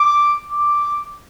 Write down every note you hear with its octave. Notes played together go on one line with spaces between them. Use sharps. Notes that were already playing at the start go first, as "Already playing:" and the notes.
Already playing: D6
D6